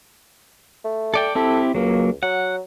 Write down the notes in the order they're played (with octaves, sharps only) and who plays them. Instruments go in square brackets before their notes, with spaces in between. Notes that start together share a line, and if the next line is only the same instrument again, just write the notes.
[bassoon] A3
[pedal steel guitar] A4 D5 G5
[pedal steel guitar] C4 E4 G4 [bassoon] A4
[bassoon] C#2 [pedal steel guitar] F#3 A#3
[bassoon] F#3 [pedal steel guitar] F#5